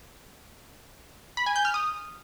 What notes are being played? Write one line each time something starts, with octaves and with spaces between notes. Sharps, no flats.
B5
G#5
G6
F6
D#6